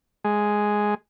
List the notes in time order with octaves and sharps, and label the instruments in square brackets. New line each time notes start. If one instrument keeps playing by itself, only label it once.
[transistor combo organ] G#3